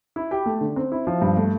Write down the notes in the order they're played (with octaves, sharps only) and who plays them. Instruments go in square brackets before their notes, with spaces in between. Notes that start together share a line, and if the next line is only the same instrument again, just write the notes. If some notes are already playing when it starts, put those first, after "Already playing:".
[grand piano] E4
G4
A3
D3
C4
E4
F3
G2
A3